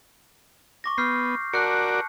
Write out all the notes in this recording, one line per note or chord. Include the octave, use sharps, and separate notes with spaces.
C#6 D6 A#6
B3 F6 G6 C7
F#4 A#4 D5 A5 F#6 C#7